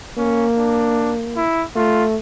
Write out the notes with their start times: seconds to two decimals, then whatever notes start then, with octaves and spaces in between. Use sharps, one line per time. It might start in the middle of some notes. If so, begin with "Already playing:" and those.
0.18 A#3 C#4
0.57 D4
1.37 E4
1.76 A3 F4